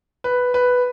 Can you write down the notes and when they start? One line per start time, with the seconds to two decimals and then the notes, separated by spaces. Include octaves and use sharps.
0.24 B4
0.54 B4